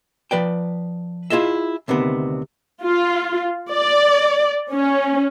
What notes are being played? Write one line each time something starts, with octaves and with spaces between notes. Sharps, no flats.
F3 B4 D5 G5
E4 F4 G#4 D#5 E5
D2 C3 D#3 B3
F4
D5
C#4